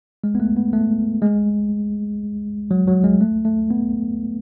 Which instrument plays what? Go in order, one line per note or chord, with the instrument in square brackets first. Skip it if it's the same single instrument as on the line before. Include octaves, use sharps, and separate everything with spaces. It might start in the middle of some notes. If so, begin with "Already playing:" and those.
[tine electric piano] G#3
B3
A3
B3
A3
G#3
F#3
F#3
G#3
A3
A3
B3